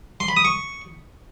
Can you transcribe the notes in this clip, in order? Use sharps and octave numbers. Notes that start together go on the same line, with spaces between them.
C6
B5
D#6
C#6